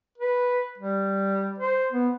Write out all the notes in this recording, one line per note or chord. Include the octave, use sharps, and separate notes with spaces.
B4
G3
C5
B3